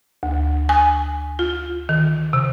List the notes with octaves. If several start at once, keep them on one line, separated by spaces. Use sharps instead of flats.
D2
G#5
F4
D#3
C3